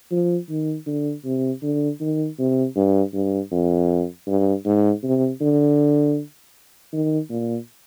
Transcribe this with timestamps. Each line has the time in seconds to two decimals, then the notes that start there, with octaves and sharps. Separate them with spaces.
0.11 F3
0.49 D#3
0.86 D3
1.25 C3
1.63 D3
2.00 D#3
2.39 C3
2.76 G2
3.13 G2
3.52 F2
4.27 G2
4.65 G#2
5.04 C3
5.40 D3
6.93 D#3
7.30 A#2